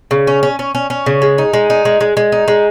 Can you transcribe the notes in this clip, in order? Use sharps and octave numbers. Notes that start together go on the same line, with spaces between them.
C#3
C#4
C#4
C#4
C#4
C#4
C#3
G#3
D#4
G#3
D#4
G#3
G#3
G#3
D#4
G#3